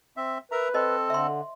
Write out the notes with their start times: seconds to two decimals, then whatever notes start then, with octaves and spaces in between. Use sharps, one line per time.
0.17 C4 E5
0.52 A#4 B4 E5 A#5
0.74 C4 A4 C5 D#5
1.10 D3 E5 C6